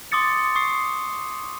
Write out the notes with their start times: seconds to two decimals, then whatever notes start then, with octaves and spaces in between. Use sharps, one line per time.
0.12 C6 D6 D#6 A6 C#7
0.55 C#6 D#6 C7